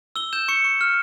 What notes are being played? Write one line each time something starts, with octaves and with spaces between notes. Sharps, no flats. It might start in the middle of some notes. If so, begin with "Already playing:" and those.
E6 G7
G6 E7
C#6 C#7
C#6
F6